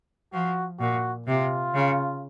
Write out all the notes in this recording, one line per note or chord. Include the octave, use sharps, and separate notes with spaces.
F3 F#4
A#2 F#4
C3 F4
C#3